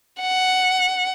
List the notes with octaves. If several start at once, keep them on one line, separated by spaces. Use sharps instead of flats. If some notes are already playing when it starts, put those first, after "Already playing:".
F#5